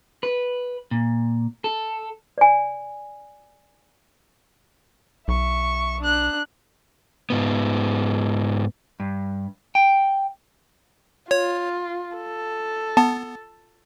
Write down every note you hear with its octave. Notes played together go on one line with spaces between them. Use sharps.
B4
A#2
A4
D5 G#5
B1 E5 C#6
D4 F#6
G#2 B3
G2
G5
F4 C#5
A4
B3 A5